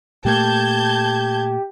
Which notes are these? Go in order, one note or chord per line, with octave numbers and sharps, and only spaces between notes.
A#2 A3 A#3 G4 A5 G6 G#6